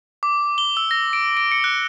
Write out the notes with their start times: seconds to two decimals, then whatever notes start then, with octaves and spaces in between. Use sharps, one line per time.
0.23 D6
0.58 G7
0.77 E6
0.91 A#6
1.13 D7
1.37 D7
1.52 C#7
1.64 F#6